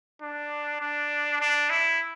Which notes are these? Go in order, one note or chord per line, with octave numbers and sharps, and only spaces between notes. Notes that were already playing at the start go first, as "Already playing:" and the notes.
D4
D4
D4
E4